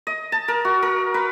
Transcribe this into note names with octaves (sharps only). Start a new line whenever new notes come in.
D#5
A5
A#4
F#4
A#4
B4